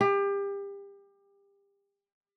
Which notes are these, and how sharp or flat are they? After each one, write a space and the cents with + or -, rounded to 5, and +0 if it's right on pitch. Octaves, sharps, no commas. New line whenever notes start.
G4 +30